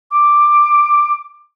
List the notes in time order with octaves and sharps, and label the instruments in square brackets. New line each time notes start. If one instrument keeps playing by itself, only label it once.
[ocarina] D6